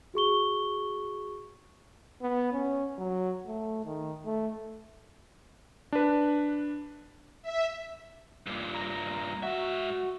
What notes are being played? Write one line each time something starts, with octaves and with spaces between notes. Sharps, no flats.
F#4 G#4 C#6 G7
B3
C#4
F#3
A3
D#3
A3
D4 B4
E5
G2 A#2
A#5
G#2 F#4 E5